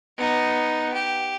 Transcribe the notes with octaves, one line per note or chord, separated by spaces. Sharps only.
B3 D#4
G4